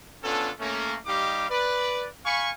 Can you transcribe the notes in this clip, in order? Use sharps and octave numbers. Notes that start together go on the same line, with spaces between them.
B3 C#4 D4 F4 A4
A3 A#3 C#4
G3 D#4 G4 D#5 F5 D6
B4 D5
F5 G#5 B5 C#6